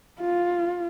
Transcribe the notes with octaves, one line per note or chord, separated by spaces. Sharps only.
F4